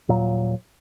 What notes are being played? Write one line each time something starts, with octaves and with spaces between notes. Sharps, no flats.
D#1 A#2 F#3